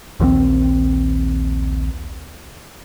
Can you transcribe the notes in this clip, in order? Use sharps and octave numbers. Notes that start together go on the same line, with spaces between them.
A#1 D#2 C#3 C4